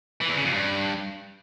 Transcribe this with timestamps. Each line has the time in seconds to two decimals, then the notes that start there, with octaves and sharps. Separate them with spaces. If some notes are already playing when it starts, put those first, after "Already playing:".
0.21 E3
0.29 E2
0.37 C#3
0.45 F2
0.53 G2